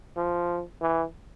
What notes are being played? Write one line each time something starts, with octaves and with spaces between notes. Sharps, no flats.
F3
E3